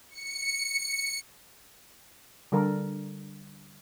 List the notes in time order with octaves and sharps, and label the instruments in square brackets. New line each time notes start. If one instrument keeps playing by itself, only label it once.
[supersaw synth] C#7
[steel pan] D3 G3 A4 A#4